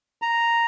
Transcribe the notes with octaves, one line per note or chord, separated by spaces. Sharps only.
A#5